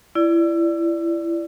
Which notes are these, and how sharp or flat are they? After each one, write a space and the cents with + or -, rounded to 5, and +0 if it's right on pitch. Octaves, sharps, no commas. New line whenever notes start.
E4 +25 D5 +0